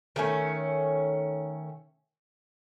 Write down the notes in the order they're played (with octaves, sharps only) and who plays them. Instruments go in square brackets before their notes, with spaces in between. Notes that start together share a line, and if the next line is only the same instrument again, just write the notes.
[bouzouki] D#3 A3 C#4